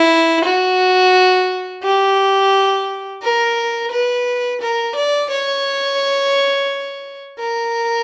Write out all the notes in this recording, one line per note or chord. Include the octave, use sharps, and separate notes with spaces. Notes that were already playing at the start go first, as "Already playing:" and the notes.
Already playing: E4
F#4
G4
A#4
B4
A#4
D5
C#5
A#4